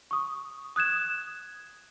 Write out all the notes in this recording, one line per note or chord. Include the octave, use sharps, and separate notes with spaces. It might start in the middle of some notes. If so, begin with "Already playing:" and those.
C#6 D#6
D#6 F#6 G#6 E7